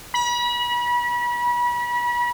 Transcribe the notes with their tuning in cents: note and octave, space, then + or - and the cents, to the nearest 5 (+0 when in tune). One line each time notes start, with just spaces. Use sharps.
B5 -35